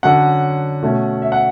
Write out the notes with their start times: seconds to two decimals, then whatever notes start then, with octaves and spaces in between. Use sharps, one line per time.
0.03 D3 F#3 C#4 F#5
0.82 B2 A3 C#4
1.22 E5
1.32 F#5